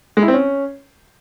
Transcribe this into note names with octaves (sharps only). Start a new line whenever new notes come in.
G#3
E4
C4
C#4